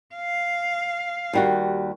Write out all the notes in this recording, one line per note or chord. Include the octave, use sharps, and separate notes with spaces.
F5
D#2 G3 F#4